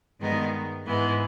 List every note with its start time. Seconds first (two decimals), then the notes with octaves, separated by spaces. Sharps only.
0.19 G2 D#3 G#3 B3 D#4
0.86 G#2 E3 G#3 B3